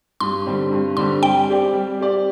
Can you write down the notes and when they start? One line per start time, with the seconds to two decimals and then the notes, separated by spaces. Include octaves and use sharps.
0.20 G2 C6
0.46 D3 G3 C4
0.72 G2
0.97 D3 G3 C4 C6
1.22 G3 G5
1.48 C4 G4 D5
1.74 G3
1.99 C4 G4 D5